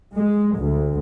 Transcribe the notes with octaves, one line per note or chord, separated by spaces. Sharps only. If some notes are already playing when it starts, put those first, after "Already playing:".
G#3
D2